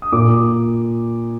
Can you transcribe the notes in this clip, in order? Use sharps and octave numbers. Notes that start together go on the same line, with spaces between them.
D#6
A#2 D6